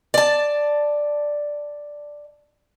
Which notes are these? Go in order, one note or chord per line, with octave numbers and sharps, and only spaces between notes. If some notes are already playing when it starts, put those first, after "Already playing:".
D5 A5